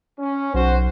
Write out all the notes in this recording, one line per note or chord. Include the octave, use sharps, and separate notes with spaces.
C#4
B1 F#4 C5